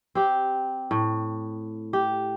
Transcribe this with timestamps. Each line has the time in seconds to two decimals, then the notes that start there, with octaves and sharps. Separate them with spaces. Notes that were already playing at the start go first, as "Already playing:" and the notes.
0.15 C4 G4
0.91 A2
1.93 G4